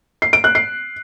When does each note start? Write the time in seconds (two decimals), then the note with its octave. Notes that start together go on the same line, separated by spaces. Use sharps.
0.22 C7
0.33 D7
0.44 F#6
0.55 C7